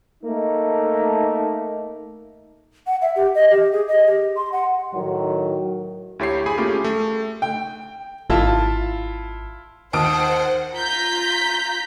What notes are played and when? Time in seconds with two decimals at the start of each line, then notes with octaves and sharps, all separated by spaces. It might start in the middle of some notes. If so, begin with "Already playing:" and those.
0.23 A3 A#3 D#4
2.87 F#5
3.02 E5
3.16 G4
3.35 D#5
3.50 G4
3.72 G#4
3.88 D#5
4.07 G4
4.37 C6
4.52 F#5
4.94 A2 D#3 F#3
6.19 D2 E4 G4 C#5 C6 C7
6.46 G#4 G#5 B5
6.57 A3 A#3 C#4 F4 G4 G#4
6.84 A3
7.42 G5
8.30 G#1 E4 F4 A5
9.93 D#2 C5 F#5 A5 D#6 F6 D7
10.74 F4 A#5 G6 B6